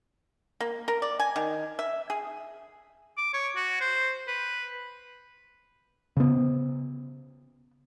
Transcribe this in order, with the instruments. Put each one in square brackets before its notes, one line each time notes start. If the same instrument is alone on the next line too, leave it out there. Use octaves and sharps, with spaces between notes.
[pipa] A#3
A#4
D5
G#5
D#3
E5
G#4
[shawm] D6
C#5
F#4
C5
B4
[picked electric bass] C#3 B3